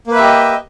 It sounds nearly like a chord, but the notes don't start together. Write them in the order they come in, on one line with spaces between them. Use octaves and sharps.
A#3 B4 E5 G4 D#5